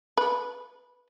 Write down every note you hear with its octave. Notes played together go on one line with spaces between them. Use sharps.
B4